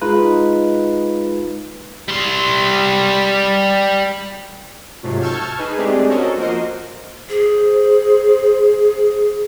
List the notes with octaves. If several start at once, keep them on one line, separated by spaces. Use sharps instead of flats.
G#3 D#4 F4 B4
G3 C6
G#2 C3 F#3 A3 F4
A5 C#6 E6 F6 G6 G#6
D#4 G#4 B4
G#3 A3 C4 D4 G4 G#4
C#4 F#4 A4 A#4 C5 D#5
F3 A#3 F#4 A#4 C5 D#5
G#4 C5